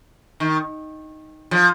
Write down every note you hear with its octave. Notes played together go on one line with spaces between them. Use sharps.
D#3
F3